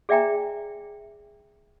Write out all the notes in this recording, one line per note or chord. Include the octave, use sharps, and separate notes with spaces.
G#4 D5 E5 G5 G#5 A#5